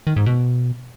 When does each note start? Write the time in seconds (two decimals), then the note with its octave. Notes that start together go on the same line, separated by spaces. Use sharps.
0.07 D#3
0.16 G#2
0.26 B2